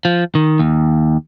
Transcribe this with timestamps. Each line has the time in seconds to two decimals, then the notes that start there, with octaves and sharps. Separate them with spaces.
0.05 F3
0.35 D#3
0.60 D#2